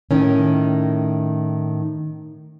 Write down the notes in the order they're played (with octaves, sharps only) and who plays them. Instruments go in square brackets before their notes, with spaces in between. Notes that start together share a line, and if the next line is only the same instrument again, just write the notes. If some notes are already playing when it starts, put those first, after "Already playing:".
[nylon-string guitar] A2 D#3 C#4